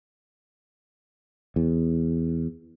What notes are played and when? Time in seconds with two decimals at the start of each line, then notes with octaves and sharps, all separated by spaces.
1.56 E2